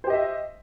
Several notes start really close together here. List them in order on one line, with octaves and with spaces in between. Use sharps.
C5 G4 D#5 E5